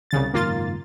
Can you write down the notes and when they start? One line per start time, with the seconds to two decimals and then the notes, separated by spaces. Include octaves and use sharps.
0.11 C2 C#3 A6
0.34 F#1 G#2 D#3 A#3 F4 A6